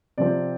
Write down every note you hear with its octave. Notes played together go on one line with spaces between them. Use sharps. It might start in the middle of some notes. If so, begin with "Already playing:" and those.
C3 F3 C4 D5